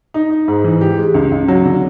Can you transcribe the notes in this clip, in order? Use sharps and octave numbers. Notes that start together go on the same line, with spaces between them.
D#4
D#4
G#2
E3
G4
G#3
C#2
C#2
F#3
D3